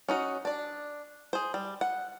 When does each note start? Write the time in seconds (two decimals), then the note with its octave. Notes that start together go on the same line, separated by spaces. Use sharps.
0.08 C#4 D#4 F#4
0.45 D4 D5
1.33 G#4 C5
1.54 G3
1.81 F#5